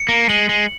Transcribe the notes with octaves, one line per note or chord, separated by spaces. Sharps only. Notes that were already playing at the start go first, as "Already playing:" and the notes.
Already playing: C#7
A#3
G#3 F#7
G#3